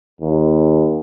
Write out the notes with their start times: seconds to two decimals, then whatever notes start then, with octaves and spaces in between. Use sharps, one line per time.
0.21 D#2